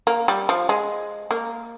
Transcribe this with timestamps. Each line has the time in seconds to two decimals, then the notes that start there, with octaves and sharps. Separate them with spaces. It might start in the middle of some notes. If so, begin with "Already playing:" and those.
0.07 A#3
0.28 G3
0.49 F3
0.69 G#3
1.31 A#3